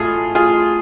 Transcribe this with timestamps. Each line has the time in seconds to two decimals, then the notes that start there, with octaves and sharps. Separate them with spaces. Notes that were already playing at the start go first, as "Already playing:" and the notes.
Already playing: A2 F4 G#4 A4
0.35 F4 G#4